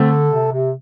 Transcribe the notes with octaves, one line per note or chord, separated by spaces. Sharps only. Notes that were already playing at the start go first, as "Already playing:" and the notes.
Already playing: D3 A3 C4
A4
C3
C3